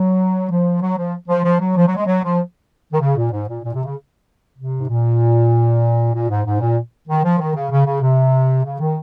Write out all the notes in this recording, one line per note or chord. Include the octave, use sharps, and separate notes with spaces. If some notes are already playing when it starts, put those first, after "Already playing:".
Already playing: F#3
F3
F#3
F3
F3
F3
F#3
F3
F#3
G#3
F#3
F3
D#3
C#3
A#2
G#2
A#2
A#2
C3
C#3
C3
G#2
A#2
A#2
G#2
G#2
A#2
D#3
F3
D#3
C#3
C#3
C#3
C3
C#3
D#3